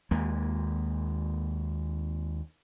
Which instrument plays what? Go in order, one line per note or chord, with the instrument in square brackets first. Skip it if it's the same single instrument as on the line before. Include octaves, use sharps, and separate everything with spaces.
[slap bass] D#2 G#3 A#3